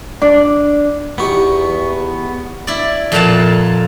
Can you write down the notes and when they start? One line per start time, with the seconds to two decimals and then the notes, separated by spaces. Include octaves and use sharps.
0.22 D4
1.18 E2 B3 D#4 F#4 G4 C#6
2.67 E4 D5
3.12 F2 A#2 A4 F5 F#5 A5